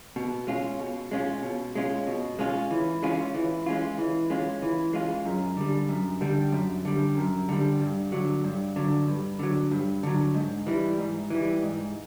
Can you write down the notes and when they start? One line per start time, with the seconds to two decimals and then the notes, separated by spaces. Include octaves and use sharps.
0.16 B2
0.47 G#3 C#4 F4
0.80 B2
1.11 G#3 C#4 F4
1.43 B2
1.75 G#3 C#4 F4
2.07 B2
2.39 G#3 C#4 F4
2.71 E3
3.03 G#3 C#4 F4
3.35 E3
3.66 G#3 C#4 F4
3.98 E3
4.30 G#3 C#4 F4
4.62 E3
4.93 G#3 C#4 F4
5.25 F#2
5.57 D3 G3
5.89 F#2
6.21 D3 G3
6.52 F#2
6.85 D3 G3
7.17 F#2
7.49 D3 G3
7.80 G2
8.12 D3 F#3
8.44 G2
8.76 D3 F#3
9.08 G2
9.39 D3 F#3
9.71 G2
10.03 D3 F#3
10.35 G#2
10.67 E3 G3
10.98 G#2
11.30 E3 G3
11.62 G#2